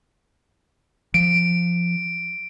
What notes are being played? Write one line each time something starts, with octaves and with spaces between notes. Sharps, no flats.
F3 D7